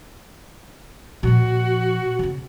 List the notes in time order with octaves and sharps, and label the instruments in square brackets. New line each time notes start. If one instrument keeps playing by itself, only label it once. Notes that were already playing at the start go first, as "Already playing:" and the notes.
[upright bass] A#2 F3 [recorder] F#4
[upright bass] C#3 B3